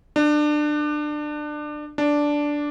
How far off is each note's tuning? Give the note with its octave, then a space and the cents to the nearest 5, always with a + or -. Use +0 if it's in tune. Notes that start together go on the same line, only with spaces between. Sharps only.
D4 +25
D4 -5